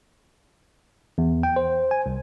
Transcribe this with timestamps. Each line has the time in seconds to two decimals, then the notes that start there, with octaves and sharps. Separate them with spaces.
1.18 E2
1.43 G5
1.56 C5
1.91 G#5
2.06 C2